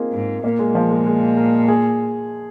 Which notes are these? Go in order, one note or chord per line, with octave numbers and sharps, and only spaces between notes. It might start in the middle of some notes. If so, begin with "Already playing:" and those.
Already playing: A#3 C4 D#4 F4 G#4
G#2
A#2 A#3
G#3
F3
G#3
G#3
A#4
G#4